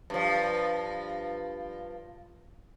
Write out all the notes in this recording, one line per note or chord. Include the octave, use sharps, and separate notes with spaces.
G2 F3